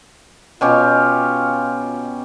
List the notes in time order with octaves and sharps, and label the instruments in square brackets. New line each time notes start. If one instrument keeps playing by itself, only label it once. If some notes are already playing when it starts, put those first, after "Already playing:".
[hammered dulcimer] B2 C#4 G4 [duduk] F4